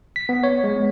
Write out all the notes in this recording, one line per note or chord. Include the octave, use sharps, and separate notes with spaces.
B6
B3
C#5
G#3
B3